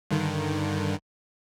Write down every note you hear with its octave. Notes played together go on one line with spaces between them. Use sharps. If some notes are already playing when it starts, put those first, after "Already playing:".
G2 D3 D#3